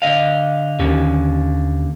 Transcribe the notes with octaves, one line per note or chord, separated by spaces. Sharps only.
D3 D#5 F5
D#2 D3 A#3 C#4